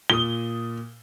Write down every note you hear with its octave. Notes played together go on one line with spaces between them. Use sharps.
A#2 D#6 G7